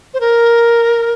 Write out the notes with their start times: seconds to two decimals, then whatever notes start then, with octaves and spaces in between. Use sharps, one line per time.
0.14 C5
0.20 A#4